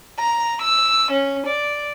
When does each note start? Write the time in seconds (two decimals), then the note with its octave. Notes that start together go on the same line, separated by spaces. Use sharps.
0.19 A#5
0.61 E6
1.11 C#4
1.45 D5